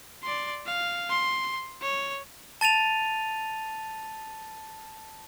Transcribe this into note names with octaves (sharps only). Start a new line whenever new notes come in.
D5 C6
F5
C6
C#5
A5 A6 D#7 F7